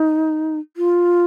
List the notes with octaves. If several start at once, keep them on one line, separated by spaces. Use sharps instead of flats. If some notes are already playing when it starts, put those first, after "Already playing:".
Already playing: D#4
F4